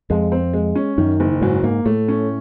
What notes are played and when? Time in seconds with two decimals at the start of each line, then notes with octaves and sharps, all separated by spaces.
0.10 F2 G#3
0.32 C4
0.53 G#3
0.75 C#4
0.98 F#2 D#3
1.20 F#1
1.41 G#2 F#3
1.63 G#2 A#3
1.86 A2 A3
2.08 C#4